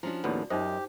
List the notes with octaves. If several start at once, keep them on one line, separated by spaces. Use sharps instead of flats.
F3 C#4 D4 E4 F#4
D#2 A2 B3 F#4 D5
F#2 D#4 F4 G4 C5 D#5